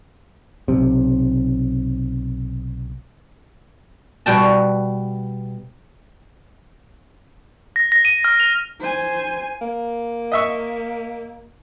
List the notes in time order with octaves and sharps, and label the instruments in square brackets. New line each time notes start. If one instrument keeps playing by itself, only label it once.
[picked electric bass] B1 C3
[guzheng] B2 G3 G5 A5
[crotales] A#6
A#6
D#7
F6
F7
[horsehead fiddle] C5 G#5
[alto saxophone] A#3
[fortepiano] D#5 E5 C#6